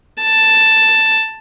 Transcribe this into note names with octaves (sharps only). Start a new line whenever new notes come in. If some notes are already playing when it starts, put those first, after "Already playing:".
A5